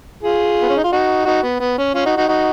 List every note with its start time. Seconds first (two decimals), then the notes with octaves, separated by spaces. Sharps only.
0.23 F4 G#4
0.61 B3
0.69 C#4
0.77 D#4
0.84 F4
0.92 D#4 F#4
1.25 D#4 F#4
1.42 B3
1.60 B3
1.78 C#4
1.94 C#4 F4
2.05 D#4 F#4
2.17 D#4 F#4
2.28 D#4 F#4